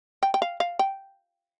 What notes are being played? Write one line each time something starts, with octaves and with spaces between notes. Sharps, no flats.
G5
G5
F5
F5
G5